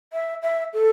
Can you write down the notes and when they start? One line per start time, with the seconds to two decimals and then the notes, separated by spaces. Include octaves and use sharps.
0.13 E5
0.43 E5
0.73 A4